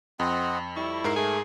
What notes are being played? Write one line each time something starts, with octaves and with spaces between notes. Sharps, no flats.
F2 C4 D#5 F#5
G3 E4 C#6
G#2 A#4 C7
A3 G#4